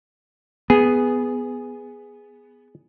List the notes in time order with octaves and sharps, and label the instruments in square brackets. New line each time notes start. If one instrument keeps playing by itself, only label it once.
[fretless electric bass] B3 [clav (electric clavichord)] G#4